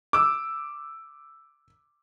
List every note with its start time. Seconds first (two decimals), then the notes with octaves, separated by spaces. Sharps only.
0.13 D6 E6